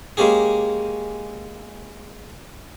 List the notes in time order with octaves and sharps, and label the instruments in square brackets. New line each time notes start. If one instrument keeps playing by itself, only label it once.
[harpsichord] G#3 A#3 C#4 G4 G#4